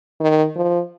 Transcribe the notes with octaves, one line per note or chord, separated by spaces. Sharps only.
D#3
F3